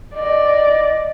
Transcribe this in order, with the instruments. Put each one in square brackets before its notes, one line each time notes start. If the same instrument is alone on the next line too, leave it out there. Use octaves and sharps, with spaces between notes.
[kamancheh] D5 [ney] D#5